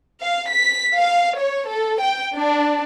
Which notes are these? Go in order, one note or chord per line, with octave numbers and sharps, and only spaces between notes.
F5
B6
F5
C#5
A4
G5
D4